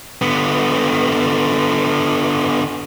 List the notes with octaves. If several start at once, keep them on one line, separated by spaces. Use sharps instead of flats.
D3 B3